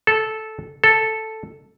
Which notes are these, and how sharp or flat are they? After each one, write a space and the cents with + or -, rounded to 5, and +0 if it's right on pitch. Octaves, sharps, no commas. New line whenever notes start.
A4 -10
A4 +0